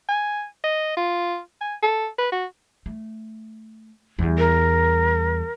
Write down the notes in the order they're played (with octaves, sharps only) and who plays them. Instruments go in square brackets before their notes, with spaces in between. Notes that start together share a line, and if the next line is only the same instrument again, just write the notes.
[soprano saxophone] G#5
D#5
F4
G#5
A4
B4
F#4
[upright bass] A3
E2 G3
[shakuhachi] A#4